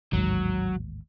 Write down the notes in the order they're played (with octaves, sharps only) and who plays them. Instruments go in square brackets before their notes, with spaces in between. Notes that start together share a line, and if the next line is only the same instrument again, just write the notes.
[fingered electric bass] A1 D#2 G#2 [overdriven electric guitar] F#3